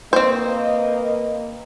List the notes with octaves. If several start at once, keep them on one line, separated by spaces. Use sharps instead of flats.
A#3 C4 B4 C5 D#5